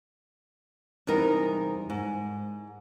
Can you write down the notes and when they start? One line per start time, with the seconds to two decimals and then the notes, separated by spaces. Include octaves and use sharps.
1.07 E2 C3 G3 D#4 A#4
1.90 G#2